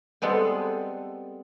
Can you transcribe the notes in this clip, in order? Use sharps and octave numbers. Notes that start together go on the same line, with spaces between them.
G3 G#3 B3 C4 A4